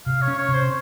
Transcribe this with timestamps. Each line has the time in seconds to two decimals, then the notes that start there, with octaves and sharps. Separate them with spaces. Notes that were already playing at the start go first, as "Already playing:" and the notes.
0.06 C3 F5
0.22 C#5
0.28 C#4
0.38 C#5
0.48 C3
0.54 C5